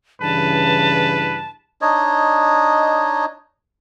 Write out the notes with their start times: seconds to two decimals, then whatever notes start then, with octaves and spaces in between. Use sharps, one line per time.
0.21 G2 C#3 E3 B4 A5
1.81 D4 D#4 C#5 D#5